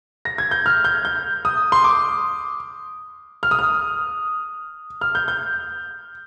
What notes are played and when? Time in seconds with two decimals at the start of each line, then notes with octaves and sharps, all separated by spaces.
0.25 A#6
0.38 G#6
0.51 G6
0.66 F6
0.84 G6
1.05 G6
1.45 D#6
1.72 C6
1.84 D6
3.43 F6
3.51 D#6
3.59 F6
5.01 F6
5.15 G6
5.28 G6